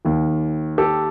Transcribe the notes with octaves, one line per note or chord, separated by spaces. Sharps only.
D#2 D#3
G4 A4